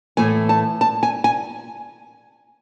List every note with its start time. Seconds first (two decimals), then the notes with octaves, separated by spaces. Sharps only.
0.17 A2 E3 A3 G#5
0.49 A5
0.81 A5
1.03 G#5
1.24 G#5